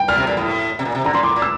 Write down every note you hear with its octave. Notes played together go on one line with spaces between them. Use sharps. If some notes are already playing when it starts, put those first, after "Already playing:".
Already playing: G5
A#2 F6
C3
A#2
A2
C3
A#2
C3
D3 A#5
A#2 C6
A2 D6
A#2
E6